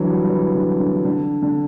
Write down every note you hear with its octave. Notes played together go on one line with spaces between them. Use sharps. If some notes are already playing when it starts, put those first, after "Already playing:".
Already playing: D3 E3 F#3
G3
E3
D3
D3
D3
D3